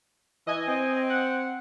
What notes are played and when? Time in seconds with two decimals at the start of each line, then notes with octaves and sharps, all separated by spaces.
0.47 E3 D#5 G#5
0.68 C4
1.10 F#5